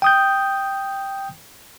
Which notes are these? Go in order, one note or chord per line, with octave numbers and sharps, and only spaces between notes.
G5 D#6 G6